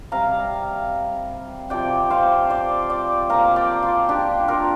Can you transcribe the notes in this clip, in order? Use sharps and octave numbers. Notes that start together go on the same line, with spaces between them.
C3 G3 F5 A#5
C3 F3 D5 G5
C5 F5
D5 G5
D5 G5
A#2 F3 F5 A#5
D5 G5
F4
D4 G4
F4 A#4